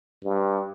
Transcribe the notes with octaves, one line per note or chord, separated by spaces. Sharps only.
G2